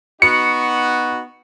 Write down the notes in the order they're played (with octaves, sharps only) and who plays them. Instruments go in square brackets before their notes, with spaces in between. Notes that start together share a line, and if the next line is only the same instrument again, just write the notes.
[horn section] B3 D#4 F#4 [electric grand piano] C#7